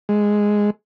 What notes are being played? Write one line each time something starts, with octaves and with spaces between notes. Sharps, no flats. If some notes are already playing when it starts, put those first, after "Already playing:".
G#3